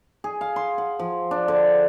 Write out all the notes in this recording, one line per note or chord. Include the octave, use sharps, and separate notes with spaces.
G#4
F5
C6
F#5
F3
D4
D3